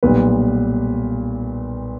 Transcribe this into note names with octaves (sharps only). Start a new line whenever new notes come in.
B1 A#2 G3 B3 B4